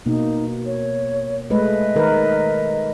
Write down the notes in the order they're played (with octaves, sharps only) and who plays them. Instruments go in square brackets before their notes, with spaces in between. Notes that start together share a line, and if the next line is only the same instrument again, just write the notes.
[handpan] B2 A#3 [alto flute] D#4
[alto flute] C#5
[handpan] G#3 A3 B4 [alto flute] D#5
[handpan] D#3 A#4 B4